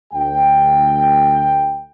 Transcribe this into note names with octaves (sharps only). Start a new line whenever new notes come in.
D2 G5